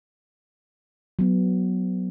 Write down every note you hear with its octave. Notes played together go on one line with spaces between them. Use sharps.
F#3 B3